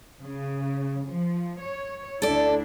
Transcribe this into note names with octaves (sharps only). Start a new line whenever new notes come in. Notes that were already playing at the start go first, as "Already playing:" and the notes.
C#3
F3
C#5
D2 D4 E4 A4 D5